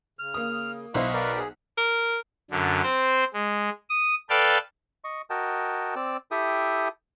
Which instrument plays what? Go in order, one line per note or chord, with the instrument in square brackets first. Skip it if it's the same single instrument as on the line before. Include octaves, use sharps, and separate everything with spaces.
[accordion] C#3 [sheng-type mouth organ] F6
[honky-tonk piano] A#3 D#6
[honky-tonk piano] B1 B2 C5 [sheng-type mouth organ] E4 [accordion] D#5 F5 C#6
[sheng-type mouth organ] A#4 B4 D5
[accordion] G#4
[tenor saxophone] A#4
[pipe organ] F#2 D3
C4 C5
G#3
D#6
A4 B4 D5 F5 G5
[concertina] D#5 C#6
F#4 A#4 D#5 G5 A5
C4 D5 E6
E4 G4 A4 E5 G5 D#6